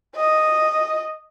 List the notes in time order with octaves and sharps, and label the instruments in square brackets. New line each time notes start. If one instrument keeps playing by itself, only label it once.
[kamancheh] D#5